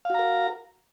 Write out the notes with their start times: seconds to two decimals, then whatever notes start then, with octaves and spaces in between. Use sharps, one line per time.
0.05 F5
0.10 F#4
0.14 A#5
0.19 A#4